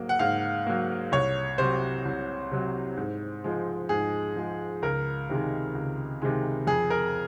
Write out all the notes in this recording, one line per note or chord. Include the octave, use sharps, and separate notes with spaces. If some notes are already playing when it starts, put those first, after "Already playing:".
Already playing: G#2 F#3 A#3
F#5
G#2 F5
F#3 A#3
C2 C#5
C3 F#3 C5
C2
C3 F#3
G#2
F3 G#3
G#2 G#4
F3 G#3
C#2 A#4
C3 D#3 G#3
C#2
C3 D#3 G#3
F2 G#4
A#4